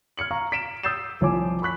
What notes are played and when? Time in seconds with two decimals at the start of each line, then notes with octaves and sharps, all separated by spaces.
0.17 F6 G#6 C#7 F#7
0.31 F5 A#5 C#6
0.52 B6 D7 E7
0.83 D#6 E6 G6 A6 C7 E7
1.21 C2 F3 C#5 G#5 D6
1.62 B5 C#6 F#6 B6